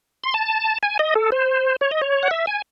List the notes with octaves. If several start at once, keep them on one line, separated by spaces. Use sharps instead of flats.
C6
A5
G#5
D#5
A4
C5
C#5
D#5
C#5
F#5
E5
G#5